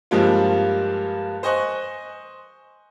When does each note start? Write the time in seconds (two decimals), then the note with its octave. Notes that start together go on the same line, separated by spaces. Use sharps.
0.11 G2 F3 G3 G#3 A#3 F4
1.43 C5 D#5 G#5 C#6 F#6